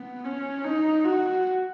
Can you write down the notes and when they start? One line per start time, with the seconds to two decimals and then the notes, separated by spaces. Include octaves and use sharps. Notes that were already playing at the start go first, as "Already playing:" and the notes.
Already playing: B3
0.24 C#4
0.65 D#4
1.05 F#4